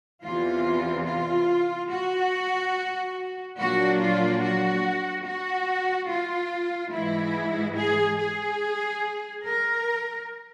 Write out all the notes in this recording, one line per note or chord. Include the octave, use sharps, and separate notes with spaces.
E2 C3 E3 F4
F4
F#4
A#2 F#3 A#3 D4 F#4
F4
F#4
F#4
F4
G#2 E3 G#3 E4
G#4
G#4
A#4